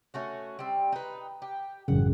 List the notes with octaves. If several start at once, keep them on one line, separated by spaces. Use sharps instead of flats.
A3 C#4 F#4
G3 C4
D#4 B4
G4
A1 F#2 C#3 F#5